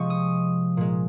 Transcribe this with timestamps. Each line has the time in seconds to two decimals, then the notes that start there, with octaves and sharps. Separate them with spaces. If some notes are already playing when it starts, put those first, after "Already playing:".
Already playing: C3 F3 G#3 D#5 C#6
0.10 D#6
0.77 A#2 G#3